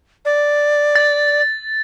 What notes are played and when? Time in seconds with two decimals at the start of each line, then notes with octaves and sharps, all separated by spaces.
0.25 D5
0.95 A6